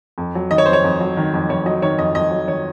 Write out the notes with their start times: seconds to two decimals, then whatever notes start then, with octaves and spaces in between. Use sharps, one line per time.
0.18 F2
0.35 F#3
0.51 D#3 D#5
0.58 C#5
0.66 F2 C5
0.73 C#5
0.84 F2
1.00 F#3
1.17 D#3
1.34 F2
1.49 F2 C#5
1.66 F#3 D#5
1.82 D#3 C#5
1.98 F2 D#5
2.15 F2 D#5
2.31 F#3
2.48 D#3 C#5